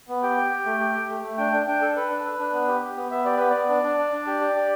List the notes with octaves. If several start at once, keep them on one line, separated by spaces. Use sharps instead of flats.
B3
G4 G5
G4
G4
A3
G4
G4
A3
A3
D4 G5
D4
D4 G5
A4
A4 B4
D4
D4
D4
B3
G4
G4
B3
B3 E5
G4 D5
B3 B4
B3 D5
D4
D4
D4
D4
G4
G4
G4